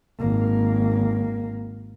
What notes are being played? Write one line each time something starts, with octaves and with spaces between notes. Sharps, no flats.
G#1 A#3